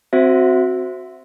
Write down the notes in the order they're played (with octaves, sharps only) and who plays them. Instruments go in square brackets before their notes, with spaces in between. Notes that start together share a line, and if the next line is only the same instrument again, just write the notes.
[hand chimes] C4 F#4 C5 E5